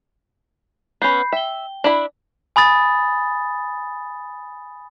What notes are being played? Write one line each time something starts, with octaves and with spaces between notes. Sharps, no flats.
B3 C#4 B5 G6 C7
E5 G5 G7
D4 E4 B5
G#5 B5 D#6 A6